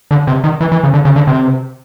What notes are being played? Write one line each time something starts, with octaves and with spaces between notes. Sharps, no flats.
D3
C3
D#3
E3
E3
C#3
D3
C#3
D3
C3